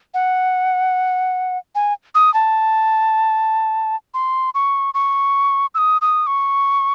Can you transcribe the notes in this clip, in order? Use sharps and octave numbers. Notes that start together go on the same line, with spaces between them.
F#5
G#5
D#6
A5
C6
C#6
C#6
E6
D#6
D#6
C#6